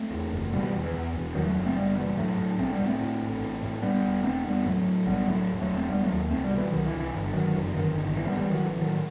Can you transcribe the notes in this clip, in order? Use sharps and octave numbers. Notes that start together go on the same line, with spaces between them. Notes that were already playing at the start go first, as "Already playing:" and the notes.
Already playing: A3 C4
E2
F#1
B2 G3 B3
E3 G3
E2
E3
E2 E3
E1
E2 D#3 F#3
F#3 A3
F#1
A3 C4
F#1 G3 B3
B2 E3 G3
A2 F#3 A3
A2
B1 A3 C4
G3 B3
A2
A3 C4
A2
A1
A1
A2
E1 G3 B3
E1
E1 A3 C4
E2 G3 B3
A2 F#3 A3
A2
B1 G3 B3
A2 F#3 A3
E1
F#3 A3
E1
A3 C4
E1 G3 B3
F#3 A3
D#2
C2 A3 C4
G3 B3
B2
E3 G3
C2 D#3 F#3
E3
C2
E3
G1
G1 D#3 F#3
F#2 E3
G1 D#3
A1 D#3
D#3
A1 E3
G3 B3
A2 E3 G3
D#3 F#3
A1
E3
A2 D#3 F#3